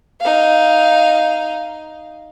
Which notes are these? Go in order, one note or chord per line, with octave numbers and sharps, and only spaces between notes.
D#4 F5